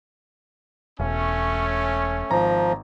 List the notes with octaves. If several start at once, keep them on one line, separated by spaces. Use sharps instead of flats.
E1 A3 C#4
G#1 F3 A#5